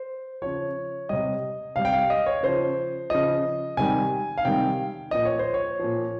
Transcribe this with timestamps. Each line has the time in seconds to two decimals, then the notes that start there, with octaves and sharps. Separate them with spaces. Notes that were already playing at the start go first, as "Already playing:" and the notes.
Already playing: C5
0.42 C#3 F3 C#5
1.09 C3 G3 D#5
1.76 C3 G3 F5
1.85 G5
1.93 F5
2.10 D#5
2.26 C#5
2.43 C#3 F3 C5
3.10 C#3 F3 D#5
3.77 C3 D#3 G3 G#5
4.38 F5
4.45 C3 D#3 G3 G5
5.11 A#2 F3 D#5
5.25 C#5
5.39 C5
5.54 C#5
5.79 A#2 F3